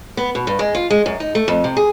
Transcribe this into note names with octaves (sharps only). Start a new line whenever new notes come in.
B3
B2
G2
G#3
F4
G#3
F#2
D#4
A3
F2
C3
G#4